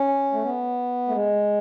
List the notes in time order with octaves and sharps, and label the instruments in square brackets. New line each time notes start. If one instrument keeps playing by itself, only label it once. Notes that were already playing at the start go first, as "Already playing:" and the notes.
Already playing: [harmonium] C#4
A3
B3
A3
G#3